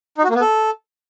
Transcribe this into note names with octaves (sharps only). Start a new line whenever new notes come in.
D#4
F#4
A#3
B3
A4